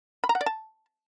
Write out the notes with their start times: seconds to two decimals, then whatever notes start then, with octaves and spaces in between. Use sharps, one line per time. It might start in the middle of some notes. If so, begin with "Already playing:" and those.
0.24 B5
0.29 A#5
0.35 F#5
0.41 D5
0.46 A5